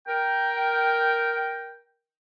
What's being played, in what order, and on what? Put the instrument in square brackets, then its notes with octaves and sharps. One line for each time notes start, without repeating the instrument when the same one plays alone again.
[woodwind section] A#4 G5